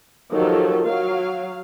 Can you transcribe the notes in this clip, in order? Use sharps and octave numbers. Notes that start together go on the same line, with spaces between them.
D#3 F3 F#3 G4 A4
F#3 F5